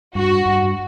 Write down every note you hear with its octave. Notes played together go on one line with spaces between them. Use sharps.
G2 F#4
G2